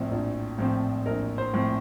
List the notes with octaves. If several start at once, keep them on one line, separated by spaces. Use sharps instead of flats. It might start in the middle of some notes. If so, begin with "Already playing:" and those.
Already playing: A#1 A2 F3 C4
A#1
A2 F3 C4
A#1 A#4
C5
A2 F3 C4